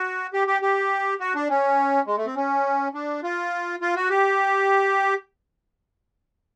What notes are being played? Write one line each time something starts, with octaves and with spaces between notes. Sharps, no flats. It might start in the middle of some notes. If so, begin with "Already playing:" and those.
Already playing: F#4
G4
G4
G4
F#4
D4
C#4
G#3
A3
C4
C#4
D4
F4
F4
F#4
G4